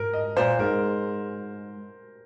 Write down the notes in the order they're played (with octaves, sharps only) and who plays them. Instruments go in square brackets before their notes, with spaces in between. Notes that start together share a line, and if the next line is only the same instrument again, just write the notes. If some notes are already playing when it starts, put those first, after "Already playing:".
Already playing: [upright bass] G#2 [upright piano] A#4
[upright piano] D#5
[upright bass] A#2 [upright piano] C5
[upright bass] G#2 [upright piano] A#4